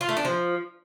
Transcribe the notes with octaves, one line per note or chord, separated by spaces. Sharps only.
F4
A3
D4
F3